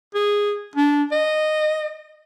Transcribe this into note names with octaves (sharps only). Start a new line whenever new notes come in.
G#4
D4
D#5